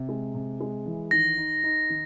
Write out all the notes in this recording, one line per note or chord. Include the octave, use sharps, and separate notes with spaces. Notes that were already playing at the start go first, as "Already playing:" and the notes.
Already playing: C3
G#3
C3
G#3
E3
D#3 A#6
D#4
D#4
D#3